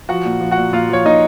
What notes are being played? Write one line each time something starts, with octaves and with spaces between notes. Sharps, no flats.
F3 F#4 F#5
A#2
F3
F#4 F#5
A#2
A#2 F4 F5
F3 C#5
A#2 D#4 D#5